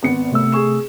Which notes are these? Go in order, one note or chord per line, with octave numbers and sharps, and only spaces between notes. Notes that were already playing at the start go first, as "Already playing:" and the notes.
G#1 B3 C#7
C3 A3 E6
G#4 C#6 E7